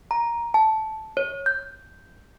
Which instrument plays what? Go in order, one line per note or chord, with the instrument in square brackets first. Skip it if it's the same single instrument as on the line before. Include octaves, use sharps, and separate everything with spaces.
[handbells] A#5
A5
C#5
G6